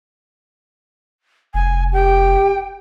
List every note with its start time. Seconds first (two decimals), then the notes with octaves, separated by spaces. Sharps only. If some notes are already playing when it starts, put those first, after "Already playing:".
1.54 F1 G#5
1.93 G4 G5